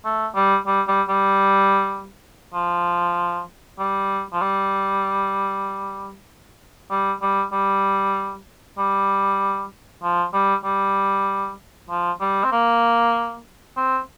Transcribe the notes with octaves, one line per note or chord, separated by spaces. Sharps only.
A3
G3
G3
G3
G3
F3
G3
F3
G3
G3
G3
G3
G3
F3
G3
G3
F3
G3
C4
A#3
C4